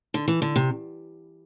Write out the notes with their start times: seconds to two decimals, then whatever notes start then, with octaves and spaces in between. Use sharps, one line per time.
0.14 D3
0.28 E3
0.42 D3
0.56 C3